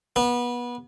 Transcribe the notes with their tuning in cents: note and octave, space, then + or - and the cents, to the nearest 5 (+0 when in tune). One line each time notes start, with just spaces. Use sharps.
B3 -25